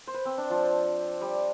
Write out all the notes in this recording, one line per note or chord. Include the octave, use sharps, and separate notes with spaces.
C5
B4
C4
D4
F3
G3